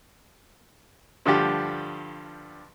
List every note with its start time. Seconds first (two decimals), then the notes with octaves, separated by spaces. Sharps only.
1.26 G2 D3 F3 G4